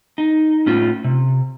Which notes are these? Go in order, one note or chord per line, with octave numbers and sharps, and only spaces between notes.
D#4
A2 C#4 F4
C3